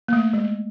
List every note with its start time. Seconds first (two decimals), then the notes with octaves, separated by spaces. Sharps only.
0.08 A#3
0.13 A3
0.33 G#3